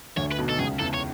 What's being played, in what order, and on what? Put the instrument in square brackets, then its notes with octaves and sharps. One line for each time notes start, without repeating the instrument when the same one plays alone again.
[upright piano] D2 D3 [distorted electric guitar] C#5
[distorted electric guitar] B4
[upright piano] B1 B2
[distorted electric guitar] A4
[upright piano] C#2 C#3 [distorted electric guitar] G#4
[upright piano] E2 E3 [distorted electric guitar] A4
[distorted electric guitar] C#5